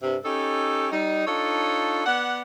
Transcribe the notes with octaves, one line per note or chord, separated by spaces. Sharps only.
G2 C3
C#4 D#4 G4 A4
G3 D#4
D4 D#4 F4 A4 C#5
B3 D5 F#5